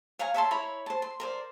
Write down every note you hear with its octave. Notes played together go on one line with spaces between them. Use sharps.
C#5 F5 G#5 A#5
C#5 E5 A5 C6
E4 C#5 A#5 B5
C5 A5
C6
A#4 C5 D5